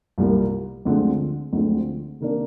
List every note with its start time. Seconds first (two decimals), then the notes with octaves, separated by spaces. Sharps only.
0.18 C2 A#2 G3 A#3
0.85 D2 D3 F3 G#3 C4
1.53 D2 D3 F3 G#3 C4
2.20 C3 D#3 A#3 D4